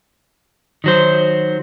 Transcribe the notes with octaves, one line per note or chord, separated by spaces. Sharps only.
D#3 F#3 C5